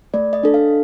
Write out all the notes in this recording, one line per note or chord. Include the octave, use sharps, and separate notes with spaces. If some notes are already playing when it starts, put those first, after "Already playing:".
A3 D5
D#5
D4 A4
F5